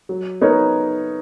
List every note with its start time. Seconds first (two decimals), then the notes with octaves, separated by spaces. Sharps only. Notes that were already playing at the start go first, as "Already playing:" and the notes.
0.09 F#3
0.41 B3 D#4 A#4 C#5